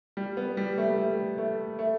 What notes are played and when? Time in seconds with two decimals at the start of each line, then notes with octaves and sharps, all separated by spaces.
0.17 G3
0.37 B3
0.57 G3
0.78 A3
0.90 G3
0.98 A3
1.38 A3
1.79 A3